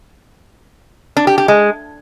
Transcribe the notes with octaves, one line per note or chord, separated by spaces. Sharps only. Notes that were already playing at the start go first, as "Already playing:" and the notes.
D4
G4
G4
G#3